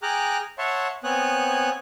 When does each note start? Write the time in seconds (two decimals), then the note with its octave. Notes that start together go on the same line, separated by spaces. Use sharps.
0.03 G#4 G5 A#5 D6 F6 F#6
0.58 C#5 E5 F#5 A5 C6 C#6
1.04 B3 C4 C#5 G#5 D#6 F#6